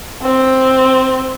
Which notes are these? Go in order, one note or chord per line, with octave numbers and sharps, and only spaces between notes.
C4